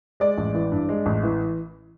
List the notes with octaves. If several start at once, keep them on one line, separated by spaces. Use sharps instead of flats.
G#3 D5
A1
E3
G2
G#3
A1
E3